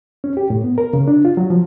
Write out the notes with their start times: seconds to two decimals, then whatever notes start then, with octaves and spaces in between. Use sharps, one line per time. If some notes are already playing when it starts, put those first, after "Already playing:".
0.24 C#4
0.37 G4
0.50 A2
0.64 B3
0.78 A#4
0.93 C#3
1.08 D4
1.25 F4
1.37 F#3
1.50 F3